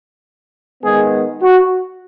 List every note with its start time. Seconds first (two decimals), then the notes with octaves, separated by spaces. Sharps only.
0.83 D#3 G#3 B3 G#4
1.42 F#4